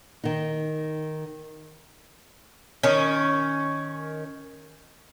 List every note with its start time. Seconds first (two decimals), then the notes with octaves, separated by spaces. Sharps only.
0.24 D#3 D#4
2.83 D#3 C#4